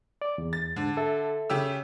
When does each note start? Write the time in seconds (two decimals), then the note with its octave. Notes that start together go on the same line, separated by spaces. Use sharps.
0.22 D5
0.38 E2
0.53 A6
0.76 G#2 D3
0.97 A4 E5
1.50 C#3 G4 E6